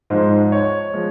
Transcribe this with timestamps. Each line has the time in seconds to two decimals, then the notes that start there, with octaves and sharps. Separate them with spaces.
0.10 G#2 F3 G#3 C5
0.52 C#5
0.94 F3 G#3